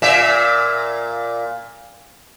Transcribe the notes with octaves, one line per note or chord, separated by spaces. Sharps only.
A#2 E5